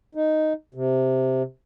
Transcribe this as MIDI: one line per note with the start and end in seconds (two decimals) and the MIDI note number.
0.15 0.53 63
0.74 1.43 48